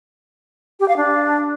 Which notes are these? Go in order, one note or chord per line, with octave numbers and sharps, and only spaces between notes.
G4
F5
D4